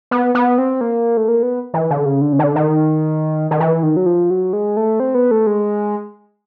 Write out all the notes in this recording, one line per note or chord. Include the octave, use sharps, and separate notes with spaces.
B3
B3
C4
A#3
A3
A#3
B3
E3
D3
C#3
D3
C#3
D#3
D3
D#3
D#3
E3
D#3
F#3
F3
F#3
G#3
A3
C4
B3
A3
G#3